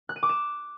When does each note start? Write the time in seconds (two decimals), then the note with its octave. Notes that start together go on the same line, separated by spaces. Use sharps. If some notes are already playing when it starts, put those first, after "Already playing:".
0.09 F#6
0.16 D#7
0.23 D6
0.29 E7